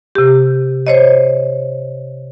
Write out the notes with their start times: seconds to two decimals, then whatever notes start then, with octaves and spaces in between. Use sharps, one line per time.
0.15 C3 G4
0.87 C5 C#5 D#5